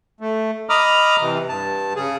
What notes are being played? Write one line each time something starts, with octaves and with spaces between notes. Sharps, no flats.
A3
D#5 A#5 B5 D6 D#6 F6
C3 E3
G2 A5
C#3 G#4